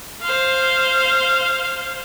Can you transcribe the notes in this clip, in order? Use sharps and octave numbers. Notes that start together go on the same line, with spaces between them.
C5 F5